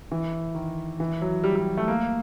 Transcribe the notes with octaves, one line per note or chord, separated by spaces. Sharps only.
E3
D#3
E3
F#3
G3
G3
A3
A#3